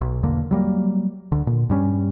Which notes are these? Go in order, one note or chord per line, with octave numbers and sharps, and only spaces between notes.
B1
B1 E2 D3 A#3
F#3 G3 A#3
D2 D3
A#2
G2 G3 C#4